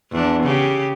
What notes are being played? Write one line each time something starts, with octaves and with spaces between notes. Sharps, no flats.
E2 D4
C#3 G4